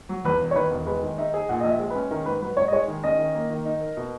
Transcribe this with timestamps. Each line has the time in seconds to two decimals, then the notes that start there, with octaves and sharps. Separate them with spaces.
0.09 F#3
0.25 E2 B4
0.40 E1
0.51 C#5
0.56 D#3 B4
0.71 E1
0.86 G#3 B4
1.03 D#3
1.18 D#4 E5
1.34 G#4
1.49 A#2 F#5
1.60 A#1 D#5
1.69 E5
1.79 G#3
1.90 B4
1.95 C#4
2.11 D#3 A#4
2.26 G#2 B4
2.42 F#3 B4
2.57 G#2 C#5
2.68 D#5
2.72 G#3 C#5
2.88 D#3
3.04 C#4 D#5
3.19 D#3
3.35 A#3
3.50 D#3
3.65 D#4
3.81 A#4
3.97 B2